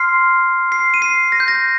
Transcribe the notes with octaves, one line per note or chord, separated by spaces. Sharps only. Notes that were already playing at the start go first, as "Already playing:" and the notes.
Already playing: C6 F6 C7
C7
D#7
C7
A#6
G6
A#6